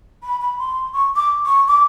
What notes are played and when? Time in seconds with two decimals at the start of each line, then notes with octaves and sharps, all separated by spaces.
0.23 B5
0.40 B5
0.58 C6
0.93 C#6
1.16 D6
1.46 C#6
1.68 D6